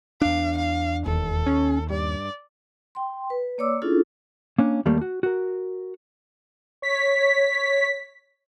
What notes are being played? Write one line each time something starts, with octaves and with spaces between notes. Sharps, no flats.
E2 D4 F5
F5
E1 D#2 A4
C#4
G2 D5
G5 C6
B4
A#3 C#5 D5 D6 E6
C#4 D4 E4 F4 G#4 A4
A#3 C#4 D4
D#2 G3 A3 A#3
F#4
F#4 A#4
C#5 B6